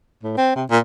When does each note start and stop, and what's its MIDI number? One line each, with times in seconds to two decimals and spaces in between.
0.23 0.35 45
0.37 0.51 60
0.56 0.65 48
0.70 0.79 46